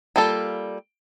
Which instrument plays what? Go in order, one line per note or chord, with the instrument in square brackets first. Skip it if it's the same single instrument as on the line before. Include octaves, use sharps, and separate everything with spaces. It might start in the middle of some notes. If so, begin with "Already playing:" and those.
[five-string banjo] G3 A#3 F4 A4